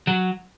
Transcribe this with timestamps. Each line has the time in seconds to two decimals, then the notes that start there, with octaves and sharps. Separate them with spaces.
0.07 F#3